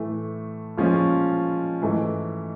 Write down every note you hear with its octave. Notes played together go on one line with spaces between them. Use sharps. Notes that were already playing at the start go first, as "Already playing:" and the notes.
Already playing: A2 E3 A3
A#2 F3 G#3 C#4 F4
G#2 E3 A3